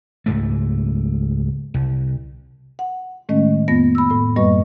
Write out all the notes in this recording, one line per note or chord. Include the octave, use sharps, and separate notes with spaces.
C#2 G#2 A3
C2
F#5
A2 D#3 G#3 A3 C#4 D#5
F2 A#3 B3 A#6
B5 E6
A2 B5
F#2 G3 A#3 B4 D#5 C#6